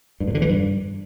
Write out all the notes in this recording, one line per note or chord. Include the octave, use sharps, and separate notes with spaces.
G2
A#2
D3
E3
G2